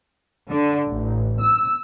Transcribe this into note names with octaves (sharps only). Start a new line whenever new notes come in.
D3
A1
E6